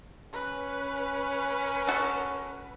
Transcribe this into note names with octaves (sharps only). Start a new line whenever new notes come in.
C#4 B4
F#4 A4